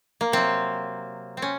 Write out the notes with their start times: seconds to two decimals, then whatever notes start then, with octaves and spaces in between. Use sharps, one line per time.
0.21 A#3
0.32 C3 F#3 C4
1.37 C4
1.42 C#4